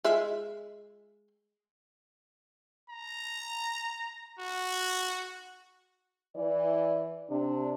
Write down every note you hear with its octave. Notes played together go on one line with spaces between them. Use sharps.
G#3 F4 E5
A#5
F#4
E3 D5
C3 D4